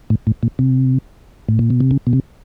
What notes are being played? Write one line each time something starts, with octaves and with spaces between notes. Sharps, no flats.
A2
A2
A#2
C3
A2
A#2
B2
C3
C#3
B2
C3